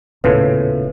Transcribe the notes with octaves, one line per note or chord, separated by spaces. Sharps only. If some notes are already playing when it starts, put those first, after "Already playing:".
D#1 A2 C#3 B3 F4 A4 B4